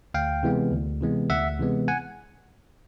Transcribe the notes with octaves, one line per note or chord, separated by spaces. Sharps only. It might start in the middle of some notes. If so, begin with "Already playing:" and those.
D2 F5 G5
C3 E3 G#3 B3
D2
C3 E3 G#3 B3
D2 E5 F#5
C3 E3 G#3 B3
F#5 G#5